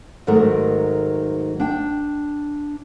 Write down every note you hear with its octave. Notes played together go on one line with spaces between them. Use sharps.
G#2 D#3 F#3 A3 A#4
D4 G5